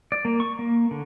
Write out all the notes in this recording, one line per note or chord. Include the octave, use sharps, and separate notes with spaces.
D5
A#3
C#6
A#3
D3